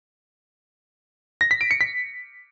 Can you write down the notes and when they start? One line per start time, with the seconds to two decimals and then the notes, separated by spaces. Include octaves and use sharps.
1.41 A#6
1.51 B6
1.61 D7
1.71 C#7
1.81 B6